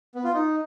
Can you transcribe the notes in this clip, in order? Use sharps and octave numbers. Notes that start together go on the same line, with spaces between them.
B3
F4
D#4